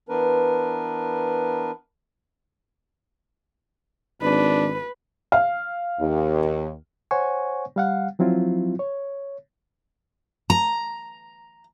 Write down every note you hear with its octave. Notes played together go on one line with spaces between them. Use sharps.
E3 B3 D4 A#4 B4
G#1 D4 B4
F5
D#2
C5 C#5 F#5 G#5 C#6
G3 F5 F#5
F3 F#3 C4 E4 F4
C#5
A#5